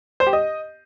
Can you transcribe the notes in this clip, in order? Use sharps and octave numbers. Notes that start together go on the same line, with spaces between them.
C5
G4
D#5